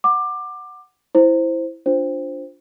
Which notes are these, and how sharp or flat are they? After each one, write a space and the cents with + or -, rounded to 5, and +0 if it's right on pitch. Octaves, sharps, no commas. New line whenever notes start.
F#5 +0 D6 +20
E4 +0 C5 +0
D4 -15 F4 +5 C5 +0